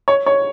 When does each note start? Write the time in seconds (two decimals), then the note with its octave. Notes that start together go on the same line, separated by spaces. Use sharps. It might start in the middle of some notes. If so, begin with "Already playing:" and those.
0.08 C#5
0.26 C#5